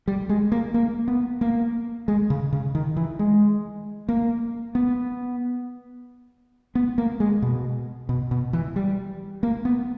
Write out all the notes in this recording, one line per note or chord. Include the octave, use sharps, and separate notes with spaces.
G3
G#3
A#3
A#3
B3
A#3
G#3
C#3
C#3
D#3
E3
G#3
A#3
B3
B3
A#3
G#3
B2
B2
B2
E3
G3
A#3
B3